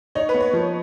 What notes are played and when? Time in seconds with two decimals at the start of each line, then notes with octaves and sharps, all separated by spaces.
0.15 D#4 C#5
0.29 B4
0.34 B3
0.41 C#5
0.53 F3